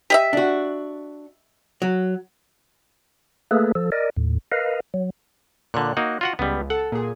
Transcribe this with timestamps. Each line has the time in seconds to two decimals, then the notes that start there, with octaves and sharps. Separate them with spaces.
0.10 G4 D#5 E5
0.33 D4 F#4
1.82 F#3
3.51 A3 A#3 G#4 A4 B4
3.75 F3 A4
3.92 A#4 D5 D#5
4.17 D#2 A2
4.52 A#4 B4 D#5 F5
4.94 F#3
5.74 A#2 D3 C#5 F#6
5.97 A#3 D#4 F#4
6.21 F4 F#4 F#5
6.39 C#2 G3 B3
6.70 A4 F#5
6.92 A#2 G#4